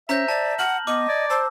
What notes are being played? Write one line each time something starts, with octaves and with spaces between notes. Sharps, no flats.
C#4 C5 E5 A#5 G6 A#6
D5 A5
F#5 F6 F#7
B3 D#5 D6
D5 G#6
C5 A5 E6